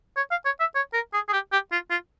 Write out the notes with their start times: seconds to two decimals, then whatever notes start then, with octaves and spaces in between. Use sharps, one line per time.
0.17 C#5
0.31 F5
0.45 C#5
0.60 E5
0.75 C#5
0.93 A#4
1.13 G#4
1.28 G#4
1.33 G4
1.52 G4
1.72 F4
1.91 F4